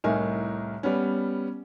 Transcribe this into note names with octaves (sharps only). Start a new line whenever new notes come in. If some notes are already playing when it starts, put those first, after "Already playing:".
C2 A2 D#4 A#4 G#5
G3 B3 C#4